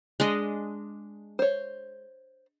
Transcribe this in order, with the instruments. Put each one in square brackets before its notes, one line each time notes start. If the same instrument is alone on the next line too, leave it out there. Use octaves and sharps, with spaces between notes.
[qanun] G#3 D4 D#5
[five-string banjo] C5 C#5